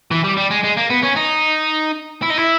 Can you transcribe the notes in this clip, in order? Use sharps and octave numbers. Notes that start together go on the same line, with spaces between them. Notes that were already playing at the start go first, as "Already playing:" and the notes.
E3
G3
G3
G#3
G#3
A#3
B3
C#4
D#4
E4
D#4
E4